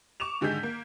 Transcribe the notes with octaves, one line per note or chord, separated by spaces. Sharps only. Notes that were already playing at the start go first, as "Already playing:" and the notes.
C#6 D6 E7 F7
G#2 D3 D#3 G#4 G6 B6
A#3